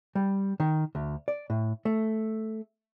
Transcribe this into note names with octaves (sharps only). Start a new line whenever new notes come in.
G3
D#3
D2
D5
A2
A3